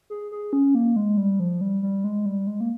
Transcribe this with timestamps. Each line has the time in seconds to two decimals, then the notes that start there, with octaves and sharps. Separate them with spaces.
0.10 G#4
0.32 G#4
0.53 C#4
0.75 A#3
0.96 G#3
1.17 G3
1.40 F3
1.61 G3
1.82 G3
2.04 G#3
2.26 G3
2.47 G#3
2.61 A#3